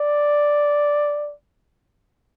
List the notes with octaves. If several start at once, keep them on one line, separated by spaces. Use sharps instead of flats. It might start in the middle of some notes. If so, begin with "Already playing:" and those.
Already playing: D5